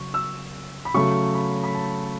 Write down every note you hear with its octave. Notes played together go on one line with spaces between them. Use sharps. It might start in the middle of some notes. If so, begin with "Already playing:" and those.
Already playing: C#3 F#3 C#4 C#6
E6
B5
C#3 F#3 A3 C#6
B5
B5
A5